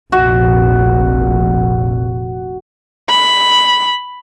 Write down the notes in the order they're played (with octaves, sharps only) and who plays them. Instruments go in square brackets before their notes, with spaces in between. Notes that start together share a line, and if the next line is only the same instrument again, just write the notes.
[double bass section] F1 A#1 [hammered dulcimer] F#4
[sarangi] B5